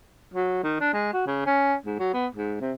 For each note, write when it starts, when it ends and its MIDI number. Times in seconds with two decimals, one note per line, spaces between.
0.34 0.59 54
0.63 0.77 51
0.81 0.91 62
0.93 1.10 56
1.13 1.23 66
1.27 1.42 49
1.46 1.75 61
1.86 1.98 44
1.99 2.10 54
2.14 2.27 59
2.35 2.56 44
2.61 2.73 48